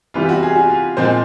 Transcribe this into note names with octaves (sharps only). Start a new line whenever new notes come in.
C3 E3 G3 B3 F4
G4
F#4
G#4
F#4
F4
A#2 F3 G#3 C4 C5